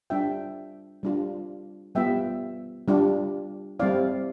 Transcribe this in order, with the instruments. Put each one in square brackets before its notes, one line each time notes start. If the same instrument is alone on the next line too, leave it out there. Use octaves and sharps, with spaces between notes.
[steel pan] G3 D4 F4 E5 G5
G3 D4 F4
G3 B3 F4 E5 G5
G3 D4 F4
G3 C4 E4 D5 F5